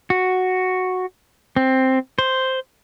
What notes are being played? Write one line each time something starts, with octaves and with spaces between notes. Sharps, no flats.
F#4
C4
C5